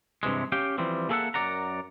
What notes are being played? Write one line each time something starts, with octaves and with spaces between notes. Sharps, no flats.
G2 C3 E3 G#3
C#4 G4 F5 G5
E3 F3 G3 C4
A#3 G#4 A4 D5 E5 F#5
F#2 A#4 D5 F#5 A#5